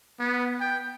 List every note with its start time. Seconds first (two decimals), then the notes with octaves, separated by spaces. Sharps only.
0.20 B3
0.61 G5